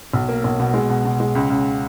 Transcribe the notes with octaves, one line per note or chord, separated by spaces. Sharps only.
B1
A#3
B1
B2
G#3
B2
B2
G#3
C#2
C#2